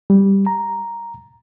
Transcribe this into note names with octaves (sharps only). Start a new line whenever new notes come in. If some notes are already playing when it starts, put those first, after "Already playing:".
G3
A#5